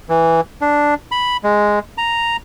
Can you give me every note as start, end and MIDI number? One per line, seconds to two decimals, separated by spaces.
0.09 0.41 52
0.61 0.94 62
1.11 1.37 83
1.44 1.79 56
1.98 2.37 82